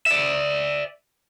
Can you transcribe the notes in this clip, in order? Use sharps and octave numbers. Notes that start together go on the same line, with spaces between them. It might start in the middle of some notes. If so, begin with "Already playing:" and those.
D5 E5